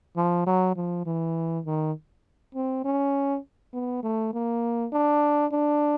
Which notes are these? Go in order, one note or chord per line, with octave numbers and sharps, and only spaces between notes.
F3
F#3
F3
E3
D#3
C4
C#4
B3
A3
A#3
D4
D4